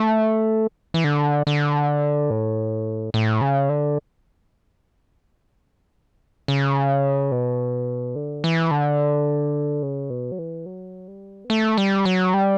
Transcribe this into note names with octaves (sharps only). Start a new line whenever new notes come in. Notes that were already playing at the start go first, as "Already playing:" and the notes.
Already playing: A3
E3
D3
D3
A2
A2
C#3
D3
C#3
B2
D3
E3
D3
C#3
B2
F#3
E3
F#3
G3
B3
A3
G3
F#3
G3